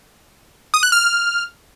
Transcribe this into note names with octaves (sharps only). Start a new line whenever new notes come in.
D#6
F#6
F6